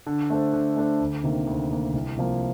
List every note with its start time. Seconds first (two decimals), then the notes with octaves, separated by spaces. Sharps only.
0.07 D3
0.30 A3 D4 A4 C5
0.53 D3
0.76 A3 D4 A4 C5
1.00 D2
1.24 C3 D#3 A#3
1.47 D2
1.70 C3 D#3 A#3
1.93 C2
2.17 C3 F3 A#3